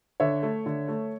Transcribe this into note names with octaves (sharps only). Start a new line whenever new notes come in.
D3 C#5 E5
A3
D3
A3